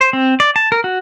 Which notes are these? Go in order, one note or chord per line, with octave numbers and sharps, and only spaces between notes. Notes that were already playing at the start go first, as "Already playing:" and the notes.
C5
C4
D5
A5
A#4
F#4